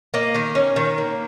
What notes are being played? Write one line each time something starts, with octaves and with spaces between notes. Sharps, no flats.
A#3 D#5
D#3 A#4
C#4
D#3
A#3